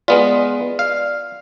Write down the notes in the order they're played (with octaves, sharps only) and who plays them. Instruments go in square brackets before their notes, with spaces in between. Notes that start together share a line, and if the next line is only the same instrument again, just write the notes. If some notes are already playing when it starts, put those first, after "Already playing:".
[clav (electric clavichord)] G#3 B3 F4 [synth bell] D5
[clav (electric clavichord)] F5